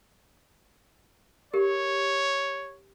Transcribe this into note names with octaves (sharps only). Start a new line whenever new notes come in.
G4 A#4 C#5